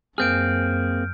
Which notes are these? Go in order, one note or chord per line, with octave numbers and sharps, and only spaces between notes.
F#2 A#3 C4 G#4 F6 G6 D7